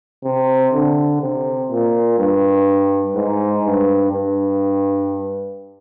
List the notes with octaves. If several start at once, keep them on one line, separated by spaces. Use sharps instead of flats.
C3
D3
C3
A#2
G2
G#2
G2
G2